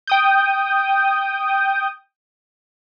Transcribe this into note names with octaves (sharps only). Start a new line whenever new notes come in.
G5 D#6 G6